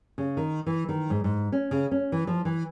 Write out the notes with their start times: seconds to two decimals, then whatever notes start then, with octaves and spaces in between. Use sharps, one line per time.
0.18 C#3
0.37 D#3
0.66 E3
0.89 D#3
1.10 G#2
1.24 G#2
1.52 C#4
1.71 C#3
1.91 C#4
2.12 E3
2.27 F3
2.45 E3